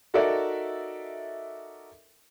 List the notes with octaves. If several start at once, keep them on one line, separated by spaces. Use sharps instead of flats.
D#4 F#4 A4 A#4 D5 E5